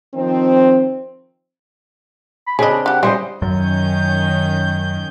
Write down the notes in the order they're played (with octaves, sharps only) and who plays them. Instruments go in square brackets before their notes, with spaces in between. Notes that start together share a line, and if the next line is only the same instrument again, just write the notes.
[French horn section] D#3 F3 C4
[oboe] B5
[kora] C#3 C4 D4 [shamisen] G#4 D#5 [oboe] B5
[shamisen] G3 G4 [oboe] F#5
[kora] G3 C5 D#5 [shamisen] G#3 E4 [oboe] C6
[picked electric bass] F#2 [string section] D#3 C#4 G6